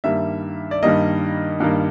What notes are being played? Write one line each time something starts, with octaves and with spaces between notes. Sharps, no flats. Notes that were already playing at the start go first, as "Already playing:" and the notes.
G2 D#3 G3 A#3 E5
D5
G2 D#3 G3 A#3 D#5
G2 D#3 G3 A#3